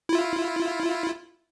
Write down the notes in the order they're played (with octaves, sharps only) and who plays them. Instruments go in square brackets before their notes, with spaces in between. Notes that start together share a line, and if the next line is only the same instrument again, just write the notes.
[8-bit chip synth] E4 F4